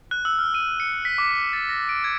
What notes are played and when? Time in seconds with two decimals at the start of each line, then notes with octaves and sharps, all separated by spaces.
0.11 F#6
0.25 E6
0.39 F6
0.54 D#7
0.80 C#7
1.05 B6
1.18 D6
1.31 D6
1.53 A6
1.69 A#6
1.89 D7
2.04 G#6